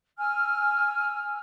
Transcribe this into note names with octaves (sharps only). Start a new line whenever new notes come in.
G#5 E6 F6